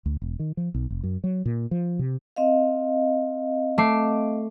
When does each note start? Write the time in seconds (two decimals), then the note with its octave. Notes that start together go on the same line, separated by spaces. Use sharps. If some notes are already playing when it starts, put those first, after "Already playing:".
0.06 D2
0.22 E1
0.39 D#3
0.57 F3
0.74 B1
0.90 F1
1.03 F#2
1.24 F#3
1.45 A#2
1.71 F3
1.99 C3
2.36 C4 D#5 F5
3.78 A3 D6 C7